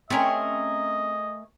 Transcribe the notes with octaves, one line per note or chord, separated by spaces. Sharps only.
A3 C4 C#4 G#4 A#4 D#5